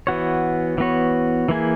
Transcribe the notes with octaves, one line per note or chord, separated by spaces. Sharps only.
E3 B3 F#4 C#5
E3 B3 F#4 C#5
E3 A#3 E4 G#4